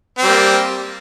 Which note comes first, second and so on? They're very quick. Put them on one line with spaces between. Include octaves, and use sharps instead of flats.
C4 G3 A#3